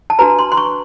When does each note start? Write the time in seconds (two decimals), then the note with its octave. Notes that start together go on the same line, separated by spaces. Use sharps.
0.10 A5
0.19 D4 F#4 B4 A#5
0.39 C6
0.52 C6
0.57 C#6